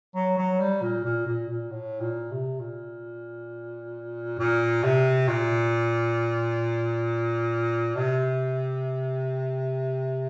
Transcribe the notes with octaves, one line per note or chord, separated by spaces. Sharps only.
F#3
F#3
G3
A#2
A#2
A#2
A#2
A2
A#2
C3
A#2
A#2
C3
A#2
C3